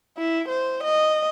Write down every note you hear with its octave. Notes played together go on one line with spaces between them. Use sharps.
E4
C5
D#5